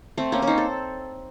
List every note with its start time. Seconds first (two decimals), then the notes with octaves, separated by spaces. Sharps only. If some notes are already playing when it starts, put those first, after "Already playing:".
0.17 A3 C4
0.32 A#3 C#4
0.42 C#4
0.47 C4 D#4
0.58 A4